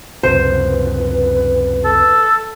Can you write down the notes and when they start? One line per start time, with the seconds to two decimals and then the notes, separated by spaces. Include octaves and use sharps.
0.23 C#2 F#2 C3 B4 C5
1.85 A4